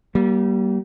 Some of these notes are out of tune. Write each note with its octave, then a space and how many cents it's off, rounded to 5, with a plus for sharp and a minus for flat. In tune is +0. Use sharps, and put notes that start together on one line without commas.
G3 -25 A#3 +25